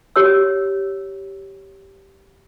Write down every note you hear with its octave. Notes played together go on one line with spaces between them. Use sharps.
G4 C#5 E6